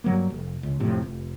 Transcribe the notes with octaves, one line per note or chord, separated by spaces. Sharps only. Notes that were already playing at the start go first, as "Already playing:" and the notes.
G2 F#3 A#3
F1
C#2
F2 A2 C3
F1